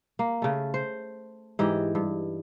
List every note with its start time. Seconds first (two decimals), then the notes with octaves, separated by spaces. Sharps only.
0.19 A#3
0.42 C#3 A3
0.74 C5
1.59 G#2 E3 G4 D#5
1.95 G2